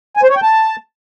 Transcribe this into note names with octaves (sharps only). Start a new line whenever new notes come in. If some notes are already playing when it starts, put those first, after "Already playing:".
G#5
C5
C#5
G5
A5